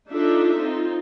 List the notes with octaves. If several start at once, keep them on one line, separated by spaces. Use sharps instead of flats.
D4 D#4 F4 A4 E5
C4 D#4 F4